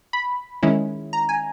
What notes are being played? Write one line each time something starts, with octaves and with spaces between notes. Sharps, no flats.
B5
D#3 G#3 C#4 E4
A#5
G#5